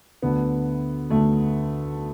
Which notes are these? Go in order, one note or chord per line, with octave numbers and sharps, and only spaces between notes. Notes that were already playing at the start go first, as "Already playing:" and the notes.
D2 D3 B3
D2 D3 A3